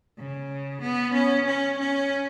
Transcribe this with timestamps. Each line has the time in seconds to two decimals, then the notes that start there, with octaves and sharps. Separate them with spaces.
0.18 C#3
0.82 B3
1.14 C#4
1.47 C#4
1.79 C#4